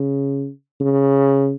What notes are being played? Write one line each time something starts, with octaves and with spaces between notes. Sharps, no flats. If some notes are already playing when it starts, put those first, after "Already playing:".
Already playing: C#3
C#3